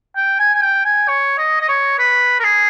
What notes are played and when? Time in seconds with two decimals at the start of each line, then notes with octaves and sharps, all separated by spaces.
0.15 G5
0.39 G#5
0.53 G#5
0.62 G5
0.84 G#5
1.08 C#5
1.38 D#5
1.61 D#5
1.68 C#5
1.99 B4
2.39 A#4
2.44 G#4